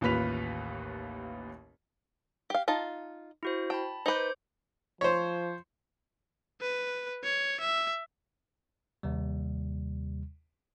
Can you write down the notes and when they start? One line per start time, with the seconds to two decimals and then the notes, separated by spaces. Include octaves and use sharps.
0.01 A1 D#2 F4 B4 B6 F7
2.50 G4 F5
2.68 D#4 F4 A5
3.43 E4 F#4 C5
3.70 G5 A5 B5
4.06 D#4 B4 C5 D6 G6
5.01 F3 C5 C#5
6.62 B4
7.24 C#5
7.60 E5
9.03 D#2 C3 G3